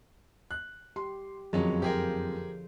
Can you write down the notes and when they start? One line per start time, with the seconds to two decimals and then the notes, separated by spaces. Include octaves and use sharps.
0.51 F#6
0.96 G4 C6
1.53 F#1 F2 D3 F3 F#3 G#3 C#4 G#4
1.82 G4 G#4 A#4 C5